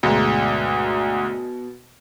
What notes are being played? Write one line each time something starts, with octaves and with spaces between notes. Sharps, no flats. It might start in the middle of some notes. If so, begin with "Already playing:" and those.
D2 G#2 B2